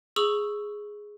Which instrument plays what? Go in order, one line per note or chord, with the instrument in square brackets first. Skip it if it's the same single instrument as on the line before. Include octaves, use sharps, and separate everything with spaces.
[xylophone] G#4 C#6 D#6 E6 F7 F#7